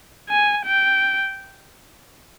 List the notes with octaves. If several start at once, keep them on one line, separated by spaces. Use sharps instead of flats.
G#5
G5